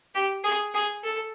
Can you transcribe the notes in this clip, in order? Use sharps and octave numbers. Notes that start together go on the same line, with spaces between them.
G4
G#4
G#4
A4